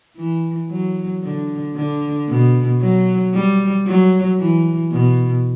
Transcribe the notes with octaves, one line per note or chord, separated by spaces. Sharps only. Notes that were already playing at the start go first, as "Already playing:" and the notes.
E3
F#3
D3
D3
B2
F#3
G3
F#3
E3
B2